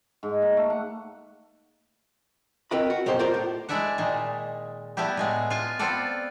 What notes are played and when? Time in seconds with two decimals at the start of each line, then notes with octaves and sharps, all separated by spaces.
0.23 G#2
0.42 A#3
0.57 A3
0.70 F#5
2.71 C4 F#4 A#4 B4 D#5 B5
2.90 F#4
3.06 F#2 B2 A#3 G4 C5
3.19 F4 A#4 C5 D5
3.34 A2
3.69 G#3 A3 E4 D5 E5 F#5
3.98 A#2 D#3 G#3
4.97 G3 A3 B3 E4 G4
5.17 A2 G#3 B3
5.50 F4 G#5 A5
5.79 B3 C4 F4 A4 D5